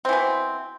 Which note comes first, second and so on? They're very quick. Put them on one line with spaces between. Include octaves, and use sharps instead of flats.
C4 E3 B2